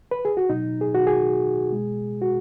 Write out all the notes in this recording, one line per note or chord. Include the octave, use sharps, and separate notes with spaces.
B4
G#4
F#4
B2 F#3 D#4
G#4
F#4
G#4
B2 G#3
F#4